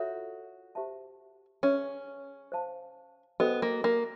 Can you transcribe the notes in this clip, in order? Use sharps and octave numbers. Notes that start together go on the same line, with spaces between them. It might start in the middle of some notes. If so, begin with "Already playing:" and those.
Already playing: F4 F#4 A4 C#5 E5
G4 C5 E5 A5
C#4 G#4 B4 E5
C5 F5 A5
B3 F#4 A4 C5 D#5 G5
A#3
A#3